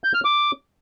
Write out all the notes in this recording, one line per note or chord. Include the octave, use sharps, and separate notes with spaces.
G6
F6
D6